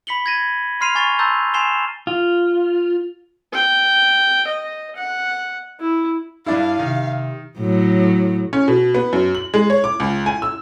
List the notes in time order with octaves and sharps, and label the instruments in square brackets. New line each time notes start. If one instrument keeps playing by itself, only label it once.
[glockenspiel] B5 B6 C#7 F#7 G7
G#6 A#6 D#7
B5 C6 F6 C7 D#7 F7
G#5 C#6 A6 F7 G7
A5 A#5 C6 E6 G6 A6
G#5 C6 C7 E7 F7 G7
[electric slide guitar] F4
[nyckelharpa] G5
D#5
F#5
E4
[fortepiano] G2 D4 E4 [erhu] F5
[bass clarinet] C3 [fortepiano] D#3
[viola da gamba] A2 F#3
[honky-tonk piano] C#4
B2
B3
F#2
F#7
G#3
C#5
D6
C#2
G#5
E6